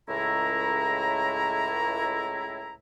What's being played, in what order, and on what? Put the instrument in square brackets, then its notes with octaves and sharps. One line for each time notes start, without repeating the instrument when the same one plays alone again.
[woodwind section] C#2 A2 E4 A#5